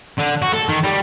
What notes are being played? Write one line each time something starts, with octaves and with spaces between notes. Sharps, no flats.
D3
F#4
A4
D#3
G3